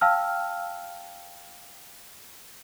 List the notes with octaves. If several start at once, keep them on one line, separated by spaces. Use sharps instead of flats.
F5 G5 A5 E6 F6